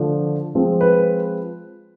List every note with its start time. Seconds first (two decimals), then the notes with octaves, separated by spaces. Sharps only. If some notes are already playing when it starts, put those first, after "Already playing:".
Already playing: D3 F3 A3 D4
0.55 F3 G#3 C4
0.81 B4